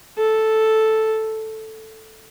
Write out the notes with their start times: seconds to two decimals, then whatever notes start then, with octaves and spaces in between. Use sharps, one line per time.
0.18 A4